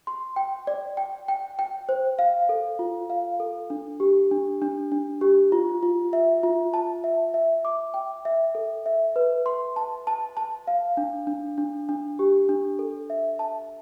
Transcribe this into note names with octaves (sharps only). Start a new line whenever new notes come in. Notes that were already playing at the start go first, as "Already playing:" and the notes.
C6
G5
D5
G5
G5
G5
C5
F5
A4
F4
F5
A4
D4
G4
D4
D4
D4
G4
F4
F4
E5
F4
A5
E5
E5
D6
G5
E5
A4
E5
B4
C6
A5
A5
A5
F5
D4
D4
D4
D4
G4
D4
A4
E5
A5